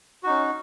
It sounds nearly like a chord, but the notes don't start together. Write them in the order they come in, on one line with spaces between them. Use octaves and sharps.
F#4 D#4 C#4